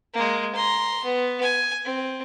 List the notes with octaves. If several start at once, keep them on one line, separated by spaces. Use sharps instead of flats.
G#3 A#3
A#5 C6
B3
G#5
C4